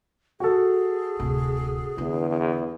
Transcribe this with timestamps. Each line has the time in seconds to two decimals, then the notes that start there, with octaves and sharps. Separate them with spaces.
0.40 F#4 G#4 A4
1.20 D1 C3
1.98 E2 D3